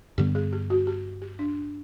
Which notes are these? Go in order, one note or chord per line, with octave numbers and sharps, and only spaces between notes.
G2 D3 G3 B3 G4
G#4
G4
F#4
G4
G4
D4